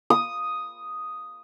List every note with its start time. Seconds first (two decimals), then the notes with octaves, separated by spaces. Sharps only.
0.10 D#6